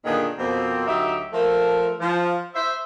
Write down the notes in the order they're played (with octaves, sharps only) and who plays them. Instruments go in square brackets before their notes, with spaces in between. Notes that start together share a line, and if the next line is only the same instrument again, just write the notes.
[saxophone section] A#2 D3 D#3 B3 D4 G#4
F2 B2 A#3 C4
D2 F#3 D#4 G4 E5
F3 A3 A#4
F3
C5 E5